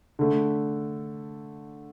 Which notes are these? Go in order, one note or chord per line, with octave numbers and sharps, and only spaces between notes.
D3 A3